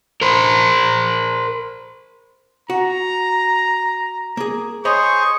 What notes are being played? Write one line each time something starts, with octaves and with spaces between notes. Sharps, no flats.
A#4 C5
F#4 A#5
A#3 G#4
G#4 C5 C#5 D#5 B5 C#6